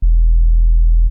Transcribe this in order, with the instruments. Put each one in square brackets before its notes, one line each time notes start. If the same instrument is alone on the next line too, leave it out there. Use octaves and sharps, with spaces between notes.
[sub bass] E1